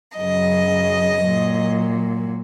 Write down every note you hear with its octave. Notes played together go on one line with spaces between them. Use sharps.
F#2 C#3 F#3 D#5
A#2 F#3